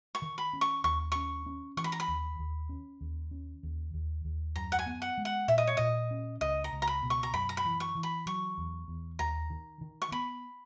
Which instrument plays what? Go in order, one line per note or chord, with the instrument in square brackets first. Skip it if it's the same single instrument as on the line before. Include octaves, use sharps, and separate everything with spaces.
[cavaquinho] C#6
[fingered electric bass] D#3
[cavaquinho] B5
[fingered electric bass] C#4
[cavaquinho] C#6
[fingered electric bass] D#2 [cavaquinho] C#6
[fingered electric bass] C#4 [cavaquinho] C#6
[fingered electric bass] C#4
[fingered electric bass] E3 [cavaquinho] C#6
[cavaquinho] B5
A#5
B5
[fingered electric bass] D#2
D#2
C#4
D#2
C#4
D#2
D#2
D#2
[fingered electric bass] F#2 [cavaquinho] A#5
[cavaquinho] F#5
G#5
[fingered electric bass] B3
[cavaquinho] F#5
[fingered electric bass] G#3
[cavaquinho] F#5
[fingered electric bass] A#2 [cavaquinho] E5
[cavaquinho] D#5
C#5
[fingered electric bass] A#2 [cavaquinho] D#5
[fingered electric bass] C#4
[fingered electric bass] C#2 [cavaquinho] D#5
[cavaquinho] A#5
[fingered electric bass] C#2
[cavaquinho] A#5
B5
[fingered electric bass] B2
[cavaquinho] C#6
A#5
[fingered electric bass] F#2 [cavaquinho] B5
[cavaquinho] A#5
B5
[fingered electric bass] E3
[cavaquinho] C#6
[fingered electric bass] E3
[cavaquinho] B5
[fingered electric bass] F#3 [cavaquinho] C#6
[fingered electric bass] E2
E2
[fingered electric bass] D#2 [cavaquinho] A#5
[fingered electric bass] D#3
D#3
[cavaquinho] C#6
[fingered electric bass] B3 [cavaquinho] B5